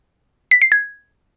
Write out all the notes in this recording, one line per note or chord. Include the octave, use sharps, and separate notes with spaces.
B6
C7
G#6